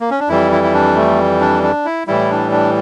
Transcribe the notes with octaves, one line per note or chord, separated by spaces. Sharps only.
A#3
C#4
D4
F2 E3 G3 E4
E4
E4
D4
A3
D4
D4
E4
A2 E3 G3 E4
D4
D4